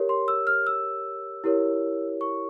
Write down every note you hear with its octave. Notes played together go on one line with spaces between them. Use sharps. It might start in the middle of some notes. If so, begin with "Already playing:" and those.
Already playing: G4 A#4 C#5
C6
E6
F6
E6
E4 G4 A#4 C#5
C#6